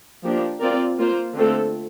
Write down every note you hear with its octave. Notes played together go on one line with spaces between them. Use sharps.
F3 A#3 D4 G4
C4 F4 A#4 D5
A#3 F4 C5
D3 A3 C4 F4 A4